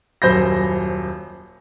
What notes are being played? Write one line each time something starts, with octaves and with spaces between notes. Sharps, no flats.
D#1 F#2 C5 B5 G6 A#6